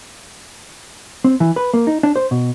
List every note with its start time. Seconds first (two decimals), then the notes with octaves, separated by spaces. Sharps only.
1.24 C4
1.40 E3
1.56 B4
1.74 A#3
1.87 D#4
2.03 D4
2.16 C5
2.31 B2